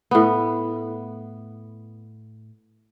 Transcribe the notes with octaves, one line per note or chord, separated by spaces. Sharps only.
A2 B3